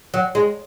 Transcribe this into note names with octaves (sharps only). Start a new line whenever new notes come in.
F#3
G#3